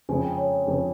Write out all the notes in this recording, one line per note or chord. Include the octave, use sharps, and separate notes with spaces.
F2 C#3 G#3 G#5
G5
C#5
C#5
F2 C#3 G#3